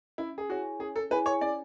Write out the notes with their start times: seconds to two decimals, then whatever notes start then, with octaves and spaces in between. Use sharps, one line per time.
0.18 C#4 E4
0.38 G#4
0.49 E4 F#4 G#4 C#5 G#5
0.79 C#4 G#4
0.96 A4
1.11 E4 G#4 B4 C#5 G#5
1.26 C#5
1.41 C#4 D5